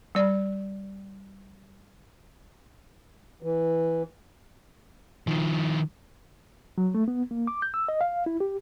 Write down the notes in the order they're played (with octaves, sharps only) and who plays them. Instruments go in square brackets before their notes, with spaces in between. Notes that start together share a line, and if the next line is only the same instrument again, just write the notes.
[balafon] G3 D5
[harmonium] E3
[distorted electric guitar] D#3 F3
[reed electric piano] F#3
A3
B3
A#3
D6
G6
E6
D#5
F5
E4
G4